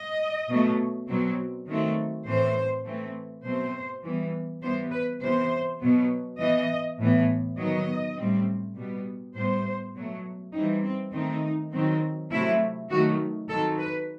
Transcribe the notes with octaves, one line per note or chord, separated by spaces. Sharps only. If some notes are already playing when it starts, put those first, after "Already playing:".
Already playing: D#5
B2 F#3 A3
B2 F#3 C4
D#3 F#3 A3 C4
A2 E3 A3 C4 C5
E3 A3 C4
B2 F#3 A3 C4 C5
E3 G3 B3
E3 G3 B3 C5
B4
C3 E3 B3 C5
B2 F#3 B3
E3 B3 D#5
A2 E3 B3
D#3 F#3 B3 D#5
A2 G3 C4
B2 G3 B3
A2 G3 B3 C5
B2 F#3 A3
E3 G3 C4 D#4
C4
D#3 A3 C4 D#4
D#3 F#3 C4
C3 F#3 A3 C4 E4
D#3 F#3 A3 F#4
D#3 F#3 C4 A4
B4